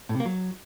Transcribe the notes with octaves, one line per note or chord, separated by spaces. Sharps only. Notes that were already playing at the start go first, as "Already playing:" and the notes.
A2
C3
A#3
F#3